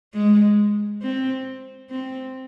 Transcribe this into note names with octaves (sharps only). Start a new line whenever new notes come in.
G#3
C4
C4